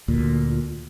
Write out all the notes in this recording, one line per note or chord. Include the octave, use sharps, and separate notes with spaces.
D2 A#2